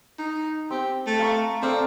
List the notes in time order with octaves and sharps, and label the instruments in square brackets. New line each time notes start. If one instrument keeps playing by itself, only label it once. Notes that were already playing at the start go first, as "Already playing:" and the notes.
[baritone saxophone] D#4
[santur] C4 [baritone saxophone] G4
[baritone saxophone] A3
[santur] F5 A#5 C#6
[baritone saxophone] C4 [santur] A4 D5 F5